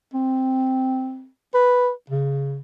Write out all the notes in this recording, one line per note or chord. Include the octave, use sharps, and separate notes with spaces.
C4
B4
C#3